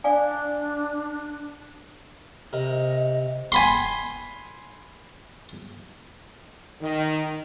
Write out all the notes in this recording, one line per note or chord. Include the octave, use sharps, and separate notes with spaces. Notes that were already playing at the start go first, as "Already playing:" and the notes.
D4 D5 F5 G#5
C3 A#4 D#5
G#5 B5 C6
D#3